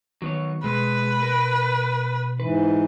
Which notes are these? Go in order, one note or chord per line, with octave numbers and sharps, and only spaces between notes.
D#3 F#3 B3 C#5
B2 G#3 B4
A#4
G#2 E3 B4